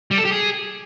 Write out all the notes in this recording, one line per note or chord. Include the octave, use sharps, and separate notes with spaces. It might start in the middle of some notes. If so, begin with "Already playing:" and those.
G3
A4
G4
G#4